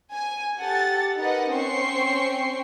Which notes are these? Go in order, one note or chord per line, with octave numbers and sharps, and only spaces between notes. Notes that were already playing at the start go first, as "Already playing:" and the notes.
G#5
G4 A4 F#5 A6
D#4 A#4 B4 D#5 F#5
C4 C#4 C5 G5 C#6 C7